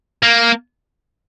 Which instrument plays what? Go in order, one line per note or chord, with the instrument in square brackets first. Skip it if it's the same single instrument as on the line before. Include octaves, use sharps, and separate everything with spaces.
[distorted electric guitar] A#3